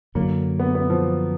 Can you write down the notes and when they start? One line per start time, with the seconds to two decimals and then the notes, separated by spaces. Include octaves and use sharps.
0.15 F#2 D3 F#3 A#3
0.60 B3
0.75 B3
0.90 F3